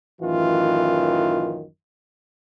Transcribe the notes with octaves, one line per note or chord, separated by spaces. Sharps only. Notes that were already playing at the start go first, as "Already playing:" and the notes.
A1 F#2 D#3 E3 F4